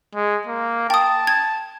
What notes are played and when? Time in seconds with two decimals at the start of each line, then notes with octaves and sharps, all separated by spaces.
0.15 G#3
0.47 A#3
0.90 G5 A5 D#6
1.27 G#6